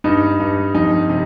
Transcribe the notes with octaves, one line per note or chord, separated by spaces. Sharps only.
G2 D#4
G2
F2 D#4
C3